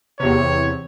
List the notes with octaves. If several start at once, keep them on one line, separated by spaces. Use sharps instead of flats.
E2 C3 C#5